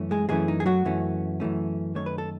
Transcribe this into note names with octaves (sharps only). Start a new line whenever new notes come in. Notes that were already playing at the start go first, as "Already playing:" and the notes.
Already playing: F#2 E3 A3 C#4
G#3 G#4
F#2 E3 G#3 A3 C#4 G#4
D#4
G#4
F#3 F#4
F#2 E3 A3 C#4
F#2 E3 A3 C#4
F#2 D#3 A3 C#5
B4
A4